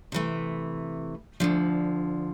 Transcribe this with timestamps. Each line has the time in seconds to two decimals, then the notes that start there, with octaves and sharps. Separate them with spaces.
0.12 C3 E3 A3
1.40 D2 D3 F3